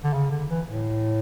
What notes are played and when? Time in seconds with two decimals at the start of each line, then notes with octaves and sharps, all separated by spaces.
0.04 D3
0.13 C#3
0.31 D3
0.49 E3
0.67 A2